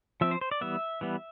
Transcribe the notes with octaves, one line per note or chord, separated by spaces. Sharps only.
F3 C4 E5
C5
C5
D5
E3 G3 B3 E5
E3 G3 B3